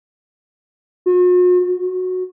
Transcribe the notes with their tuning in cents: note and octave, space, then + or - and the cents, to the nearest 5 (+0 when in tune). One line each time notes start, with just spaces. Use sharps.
F#4 -45
F#4 -10